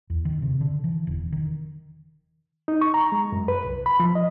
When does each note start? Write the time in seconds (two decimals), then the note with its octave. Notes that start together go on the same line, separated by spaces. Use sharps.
0.10 E2
0.25 D#3
0.42 C3
0.61 D3
0.84 E3
1.07 E1
1.32 D#3
2.68 D#4
2.81 C#6
2.94 A#5
3.12 G#3
3.32 F#2
3.48 B4
3.65 C2
3.86 B5
4.00 F3
4.15 D#5